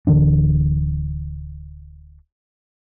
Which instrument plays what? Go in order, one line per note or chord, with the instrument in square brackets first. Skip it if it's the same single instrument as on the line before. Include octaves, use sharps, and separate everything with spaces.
[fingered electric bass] D1 D3 E3 D4